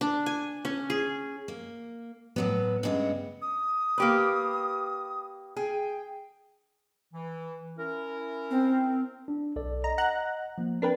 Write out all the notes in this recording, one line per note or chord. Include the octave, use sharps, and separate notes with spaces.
D4
G#5
C#4
G#4
A#3
A2 F#3 B3
G2 C#3 G#3 B3 E4
D#6
A#3 G4 B4
G#4 G5
E3
C#4 E4 A#4
C4
D4
B1 A4 D5
D#5 A#5
F#5 A#5 F#6
F3 A#3
C4 D4 A#4 B4 G5